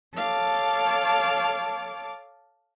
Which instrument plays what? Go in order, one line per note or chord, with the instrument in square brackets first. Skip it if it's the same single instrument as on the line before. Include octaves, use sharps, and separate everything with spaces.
[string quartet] A4 C#5 F5 A5 D6